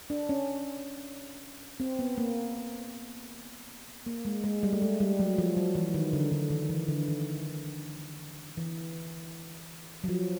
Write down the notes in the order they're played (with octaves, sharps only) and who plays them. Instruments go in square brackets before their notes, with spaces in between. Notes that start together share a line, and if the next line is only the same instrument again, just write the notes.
[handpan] D4
C#4
C4
B3
A#3
A#3
G#3
G#3
G3
A3
G#3
G3
F#3
F3
F#3
E3
D#3
D3
D3
D#3
E3
D3
D#3
E3
F#3
F3